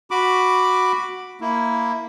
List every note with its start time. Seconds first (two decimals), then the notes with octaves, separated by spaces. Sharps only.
0.11 F#4 B5 D6
1.41 A#3 E4